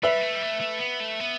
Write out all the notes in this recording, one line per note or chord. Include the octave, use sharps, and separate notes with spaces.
G3 B4 E5
A3
G3
A3
A3
B3
A3
B3